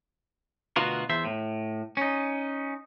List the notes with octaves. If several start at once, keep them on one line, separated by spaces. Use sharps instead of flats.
D2 B2 B3 F4 F#4 A#4
E2 C5 E5
A2
C#4 D#4